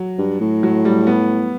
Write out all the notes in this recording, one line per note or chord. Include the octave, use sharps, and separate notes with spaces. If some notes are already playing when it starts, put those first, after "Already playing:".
Already playing: F#3
G2
A2
F#3
G3
B3